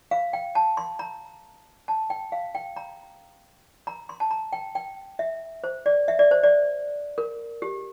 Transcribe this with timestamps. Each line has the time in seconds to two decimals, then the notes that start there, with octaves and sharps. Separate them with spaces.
0.11 F5
0.33 G5
0.55 A5
0.77 C6
0.99 A#5
1.88 A5
2.10 G5
2.32 F5
2.55 G5
2.77 A#5
3.87 A#5
4.09 C6
4.20 A5
4.31 A#5
4.53 G5
4.75 G5
5.19 E5
5.64 C5
5.86 D5
6.08 E5
6.19 D5
6.31 C5
6.43 D5
7.18 A#4
7.62 G4